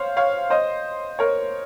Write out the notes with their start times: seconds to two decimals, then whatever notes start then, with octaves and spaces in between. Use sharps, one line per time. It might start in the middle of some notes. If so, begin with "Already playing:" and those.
Already playing: C5 C#5 F5
0.17 C#5 F5
0.50 C5 D#5
1.19 A#4 C#5